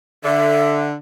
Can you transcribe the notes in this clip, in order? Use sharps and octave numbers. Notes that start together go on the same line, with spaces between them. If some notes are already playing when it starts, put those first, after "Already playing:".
D3 E5